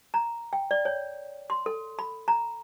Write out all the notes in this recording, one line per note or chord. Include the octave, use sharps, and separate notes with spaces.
A#5
G5
D5
C#5
C6
A4
B5
A#5